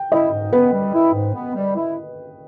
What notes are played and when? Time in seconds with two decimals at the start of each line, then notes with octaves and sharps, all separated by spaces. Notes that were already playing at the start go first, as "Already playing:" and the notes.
Already playing: G5
0.12 E4 D#5
0.31 G#2
0.53 B3 B4
0.73 G3
0.94 E4
1.13 G#2
1.34 B3
1.55 G3
1.76 E4